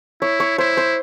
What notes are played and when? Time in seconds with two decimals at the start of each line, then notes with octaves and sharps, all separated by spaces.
0.22 E4 C#5
0.40 C#5
0.58 E4 C5
0.77 C5